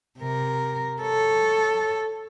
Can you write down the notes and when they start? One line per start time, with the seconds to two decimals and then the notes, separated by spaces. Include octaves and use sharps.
0.18 C3 A#4
1.01 A4 C#5